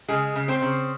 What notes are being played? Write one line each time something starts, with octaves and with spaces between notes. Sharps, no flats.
C#3 G#3 G#4
C#3
C4 C5
C#3